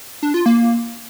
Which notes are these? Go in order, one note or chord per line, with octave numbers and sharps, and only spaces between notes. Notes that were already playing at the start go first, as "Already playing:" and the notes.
D4
F4
A#3